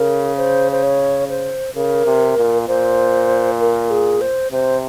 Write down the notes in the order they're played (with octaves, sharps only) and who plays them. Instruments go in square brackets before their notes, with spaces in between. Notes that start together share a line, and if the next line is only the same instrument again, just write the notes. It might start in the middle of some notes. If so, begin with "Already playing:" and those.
Already playing: [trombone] C#3 [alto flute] A#4
[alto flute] C5
C5
C#5
C5
[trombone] C#3 [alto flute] A#4
[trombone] C3
A#2
[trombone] A#2 [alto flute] C5
[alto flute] A#4
G#4
C5
[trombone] C3 [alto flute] C5